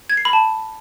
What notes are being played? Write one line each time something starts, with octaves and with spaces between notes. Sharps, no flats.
G#6
C7
B5
A5